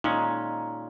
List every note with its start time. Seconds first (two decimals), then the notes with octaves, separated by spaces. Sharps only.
0.04 A#2 G#3 C#4 D#4